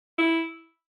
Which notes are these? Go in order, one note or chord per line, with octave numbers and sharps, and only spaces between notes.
E4